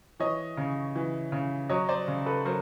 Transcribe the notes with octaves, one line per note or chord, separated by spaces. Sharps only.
E3 C#5 D#5
C#3
E3
C#3
F#3 C#5 D#5
C5 D5
C#3
A4 B4
F#3 A#4 C5